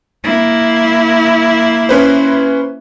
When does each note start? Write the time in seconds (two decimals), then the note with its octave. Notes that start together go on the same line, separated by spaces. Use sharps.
0.24 A#3 E4
1.89 C#4 B4 C5